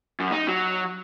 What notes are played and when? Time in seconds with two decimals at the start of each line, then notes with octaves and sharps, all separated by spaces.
0.20 F#2
0.32 D#4
0.48 F#3